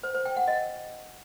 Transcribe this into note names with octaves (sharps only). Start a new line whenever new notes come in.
C5
C5
G5
F#5
D#5